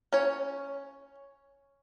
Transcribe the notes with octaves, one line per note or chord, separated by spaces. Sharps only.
C#4 C#5